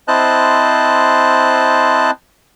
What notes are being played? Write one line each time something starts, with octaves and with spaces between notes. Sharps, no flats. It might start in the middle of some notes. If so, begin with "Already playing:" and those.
C4 E4 C5 D#5 A5 F#6